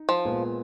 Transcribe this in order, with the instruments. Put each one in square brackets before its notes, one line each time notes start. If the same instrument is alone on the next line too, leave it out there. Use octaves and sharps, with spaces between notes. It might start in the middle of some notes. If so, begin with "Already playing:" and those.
Already playing: [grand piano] D#4
[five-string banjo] F3
[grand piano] A#2 G#3 B3 F4